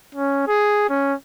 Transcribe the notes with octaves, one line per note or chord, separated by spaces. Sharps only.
C#4
G#4
C#4